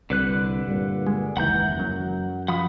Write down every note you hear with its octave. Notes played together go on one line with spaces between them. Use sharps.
C2 D3 B4 F#6
G2 A#2
G#3
F#1 D#2 E3 F#5 A#5 G6
F#2 F#3
F3 F#5 B5 D#6